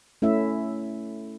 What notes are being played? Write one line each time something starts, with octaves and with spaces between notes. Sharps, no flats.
A3 C#4 E4 E5